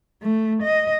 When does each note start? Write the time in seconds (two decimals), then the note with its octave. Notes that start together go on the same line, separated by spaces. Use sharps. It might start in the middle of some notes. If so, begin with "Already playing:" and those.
0.22 A3
0.63 D#5